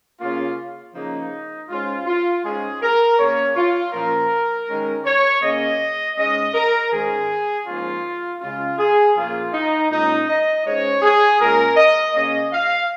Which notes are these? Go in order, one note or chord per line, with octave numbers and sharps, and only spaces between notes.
C#3 A#3 C#4 F4
C#3 F3 A#3 D#4
G#2 G#3 C#4 F4
F4
G#2 G#3 C#4 G#4
A#4
C#3 A#3 C#4 C#5
F4
A#2 F3 C#4 A#4
D#3 G#3 C#4
C#5
C#3 A#3 C#4 D#5
G#2 G#3 C#4 D#5
A#4
G#2 D#3 G#3 C#4 G#4
G#2 F3 A#3 C#4 F4
C#3 G#3 C#4 F4
G#4
A#2 F3 A#3 C#4 F4
D#4
A#2 G#3 C#4 D#4
D#5
G#2 G#3 C#4 C#5
G#4
A#2 G#3 C#4 A#4
D#5
C#3 A#3 C#4 D#5
F5